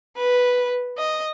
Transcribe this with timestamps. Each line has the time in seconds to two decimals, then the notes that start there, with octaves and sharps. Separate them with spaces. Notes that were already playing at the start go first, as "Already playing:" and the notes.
0.17 B4
0.98 D#5